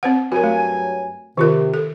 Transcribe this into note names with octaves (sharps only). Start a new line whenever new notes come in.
C4 C5 F#5
G2 F#3 F#4 A#4 G#5
A3
C3 D#3 F4 A#4
A4